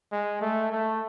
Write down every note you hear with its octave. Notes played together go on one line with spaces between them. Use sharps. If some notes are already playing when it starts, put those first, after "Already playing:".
G#3
A3
A3